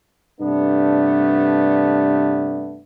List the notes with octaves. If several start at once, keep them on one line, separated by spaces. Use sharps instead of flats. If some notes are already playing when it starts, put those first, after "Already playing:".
G2 C3 A3 B3 D4